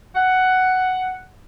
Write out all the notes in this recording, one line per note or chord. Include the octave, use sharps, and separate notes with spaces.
F#5